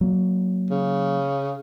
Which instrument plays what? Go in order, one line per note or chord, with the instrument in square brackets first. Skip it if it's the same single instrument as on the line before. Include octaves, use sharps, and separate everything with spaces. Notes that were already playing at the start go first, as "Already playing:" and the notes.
[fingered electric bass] F#3 A#3
[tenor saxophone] C#3